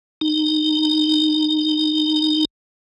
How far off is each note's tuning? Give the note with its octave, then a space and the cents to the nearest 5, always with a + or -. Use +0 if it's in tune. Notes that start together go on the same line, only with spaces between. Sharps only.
D#4 -20